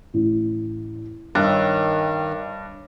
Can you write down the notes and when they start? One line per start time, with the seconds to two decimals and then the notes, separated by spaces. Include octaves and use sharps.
0.14 A1
1.35 G2 D#3 C#5 D#5 E5 F#6